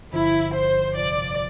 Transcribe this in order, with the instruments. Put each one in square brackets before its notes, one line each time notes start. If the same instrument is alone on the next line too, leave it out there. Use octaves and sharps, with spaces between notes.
[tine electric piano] G1 G2 D3 F3 [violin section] E4
[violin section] C5
[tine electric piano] G1 F2 C3 F3 [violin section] D5